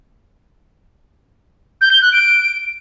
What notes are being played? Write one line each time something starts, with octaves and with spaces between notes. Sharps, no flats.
G6
G7
F#6
D7